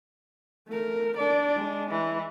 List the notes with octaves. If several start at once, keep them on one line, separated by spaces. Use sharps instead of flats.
A3 A#4
D4 D5
G#3
E3